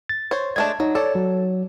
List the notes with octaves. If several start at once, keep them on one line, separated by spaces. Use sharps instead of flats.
A6
C5 C#5
G#3 A3 D4 A5 G#6
F#3 D#4
A4 C#5 D5
F#3